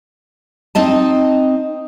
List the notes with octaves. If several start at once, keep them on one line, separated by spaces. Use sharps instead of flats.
C4 D#4 D#5 A5